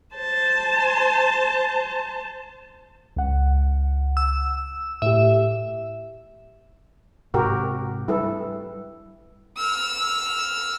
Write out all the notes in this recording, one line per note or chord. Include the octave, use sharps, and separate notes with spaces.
C5 A5
C#2 F#5
E6
A2 G4 E5
G#2 C3 F#4 G4 A#4
G3 E4 A4 B4
E6 F6